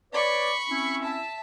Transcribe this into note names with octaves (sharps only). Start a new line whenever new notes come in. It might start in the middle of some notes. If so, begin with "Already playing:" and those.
B4 C#5 D5 B5 C#6
C4 C#4 E4
E5 A5